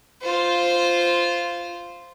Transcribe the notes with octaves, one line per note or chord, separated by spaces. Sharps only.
F4 C5